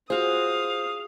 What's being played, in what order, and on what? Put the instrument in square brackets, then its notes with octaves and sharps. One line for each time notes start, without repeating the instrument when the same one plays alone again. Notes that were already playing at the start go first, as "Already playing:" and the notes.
[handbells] F4 C5 [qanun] F#4 G#4 [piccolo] F5 [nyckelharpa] D#6